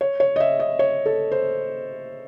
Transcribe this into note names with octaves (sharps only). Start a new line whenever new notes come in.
C#5
C#5
D#5
E5
D#5
C#5
A4
C5